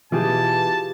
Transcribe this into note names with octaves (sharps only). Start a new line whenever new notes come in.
B2 E3 F4 G4 G#4 A5